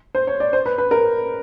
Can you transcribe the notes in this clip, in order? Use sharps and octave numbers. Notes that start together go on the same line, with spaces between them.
C5
C#5
D5
C5
B4
B4
A#4